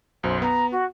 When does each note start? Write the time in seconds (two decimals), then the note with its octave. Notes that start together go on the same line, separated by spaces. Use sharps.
0.23 B1 F#2 C5
0.42 B3 A#5
0.71 F#4